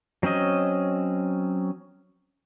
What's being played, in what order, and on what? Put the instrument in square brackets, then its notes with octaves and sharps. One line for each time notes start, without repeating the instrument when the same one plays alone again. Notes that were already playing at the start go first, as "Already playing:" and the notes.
[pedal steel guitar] F#3 C4 C#4 D#5